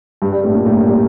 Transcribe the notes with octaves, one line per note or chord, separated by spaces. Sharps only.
G2 G3
G2 G3
A2 A3
A#2 A#3
A2 A3
A#2 A#3
G3